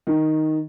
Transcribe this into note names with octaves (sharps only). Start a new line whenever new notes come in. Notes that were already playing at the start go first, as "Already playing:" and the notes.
D#3